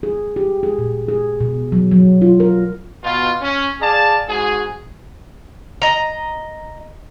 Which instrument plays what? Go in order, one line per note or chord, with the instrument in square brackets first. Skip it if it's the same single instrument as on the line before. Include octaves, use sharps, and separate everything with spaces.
[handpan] G#4
G4
G#4
A#2
G#4
B2
F#3
F#3
F4
A#4
[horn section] B2 F4
C#4
G#4 D5 F5 A5
G#2 F#4 G#4
[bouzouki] D#5 A#5